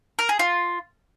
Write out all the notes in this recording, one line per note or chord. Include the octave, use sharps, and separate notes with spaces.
A#4
G#4
F4